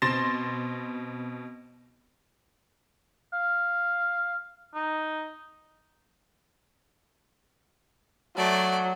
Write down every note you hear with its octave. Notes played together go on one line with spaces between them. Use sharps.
B2 C4 C6 A6 A#6 E7
F5
D#4
F#3 A3 D5